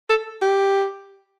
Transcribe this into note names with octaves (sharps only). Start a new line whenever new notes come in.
A4
G4